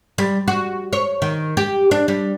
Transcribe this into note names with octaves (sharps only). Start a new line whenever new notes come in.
G3
F#4
C#5
D#3
G4
D4
G3